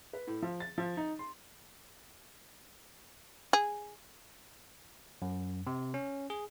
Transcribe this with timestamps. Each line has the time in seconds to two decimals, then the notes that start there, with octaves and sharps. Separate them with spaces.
0.13 B4
0.27 A2
0.42 F3
0.60 A6
0.78 F3
0.97 D#4
1.19 C6
3.53 G#4
5.22 F#2
5.67 C3
5.94 C#4
6.30 G#4